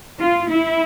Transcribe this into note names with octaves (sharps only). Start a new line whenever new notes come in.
F4
E4